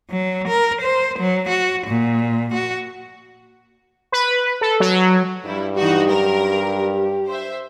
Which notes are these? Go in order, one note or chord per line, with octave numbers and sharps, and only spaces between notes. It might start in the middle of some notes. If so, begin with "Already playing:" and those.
F#3
A#4
C5
F#3
F#4
A#2
F#4
B4
A4
F#3
G2 G3 E4
E3 D#4 F#4 G4
F#3 A#4
C5 E5